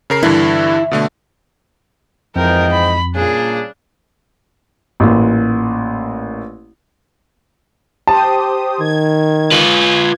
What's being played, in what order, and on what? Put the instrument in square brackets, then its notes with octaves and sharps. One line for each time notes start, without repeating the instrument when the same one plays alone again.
[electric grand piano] C#3 A#4 C7
[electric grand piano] G2 D3 E3 [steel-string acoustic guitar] E4
[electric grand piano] B2 D3 A3
[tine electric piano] F2 [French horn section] G#2 E3 D#5 [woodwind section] F3 G5 [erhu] A#4
[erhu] B5
[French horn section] A#2 [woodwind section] C#3 G3 D4 [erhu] G#4
[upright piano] A1 A#2
[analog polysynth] G4 C5 D#6 [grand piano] A5
[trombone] D#3 [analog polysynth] G#6
[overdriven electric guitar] F4 B4